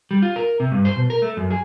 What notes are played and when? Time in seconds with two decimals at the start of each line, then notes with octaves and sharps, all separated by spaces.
0.11 G3
0.22 F4
0.36 A#4
0.60 C3
0.72 G2
0.85 C5
0.96 B2
1.10 A#4
1.22 A3
1.37 F#2
1.50 G#4